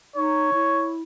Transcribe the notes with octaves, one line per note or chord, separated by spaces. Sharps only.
D#4 C#5
E4